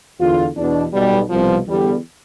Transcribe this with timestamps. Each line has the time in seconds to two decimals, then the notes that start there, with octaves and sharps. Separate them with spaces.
0.19 E2 D3 F4
0.56 E2 B2 D4
0.93 B1 B2 G3
1.30 C2 B2 F3
1.67 E2 D3 G3